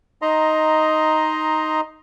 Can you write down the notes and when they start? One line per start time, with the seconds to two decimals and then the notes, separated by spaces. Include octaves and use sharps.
0.22 D#4 D#5 A#5 C6